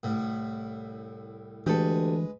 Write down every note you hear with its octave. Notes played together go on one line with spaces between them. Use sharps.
C2 A2
D2 E3 G#3 G4 A4 B4